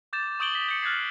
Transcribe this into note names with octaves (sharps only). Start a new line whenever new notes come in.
D6 G6 A6 E7
C#6 D#6 G6 D7 F#7 G7
B6
G6 C#7
F6 F#6 G#6 A6 C7